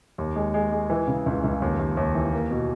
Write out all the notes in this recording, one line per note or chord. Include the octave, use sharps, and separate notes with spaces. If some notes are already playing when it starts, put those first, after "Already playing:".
D#2
G#3
G#3
G#3
E3
C#3
C#2
C#2
D#2
D#2
D#2
E3
A#3
B2